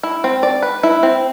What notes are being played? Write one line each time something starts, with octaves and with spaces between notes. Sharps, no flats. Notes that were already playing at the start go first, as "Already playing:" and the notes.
E4
C4
D5
B4
E4
C4